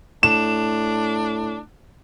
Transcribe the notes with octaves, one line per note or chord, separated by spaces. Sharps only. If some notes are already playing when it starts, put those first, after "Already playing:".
A2 D4 E7